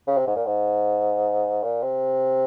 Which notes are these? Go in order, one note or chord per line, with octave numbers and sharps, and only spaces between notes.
C#3
C3
G#2
A#2
G#2
A#2
C3